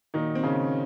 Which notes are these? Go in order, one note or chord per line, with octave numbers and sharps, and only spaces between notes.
A#2 D#3 F#3 D#4
C4
C#3 C#4